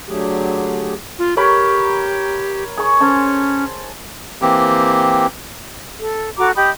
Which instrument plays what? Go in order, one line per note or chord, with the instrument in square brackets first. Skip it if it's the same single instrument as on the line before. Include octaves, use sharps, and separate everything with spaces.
[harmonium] D3 F#3 A3 G4 G#4
[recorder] F4
[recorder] G4 [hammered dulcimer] A#4 C#5 B5
[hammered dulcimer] G#4 C#6
[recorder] C#4 [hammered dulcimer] C5 G#5 A5
[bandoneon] E3 A#3 C4 G4
[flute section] A4
F#4 A4 A#5 D6
G4 D#5 B5 D#6